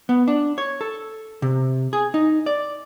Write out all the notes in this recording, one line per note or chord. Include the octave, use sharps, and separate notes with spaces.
B3
D4
C#5
A4
C3
G#4
D#4
D5